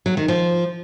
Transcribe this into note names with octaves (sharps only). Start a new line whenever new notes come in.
F#3
D#3
F3